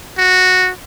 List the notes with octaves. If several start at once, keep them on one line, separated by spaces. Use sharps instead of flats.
F#4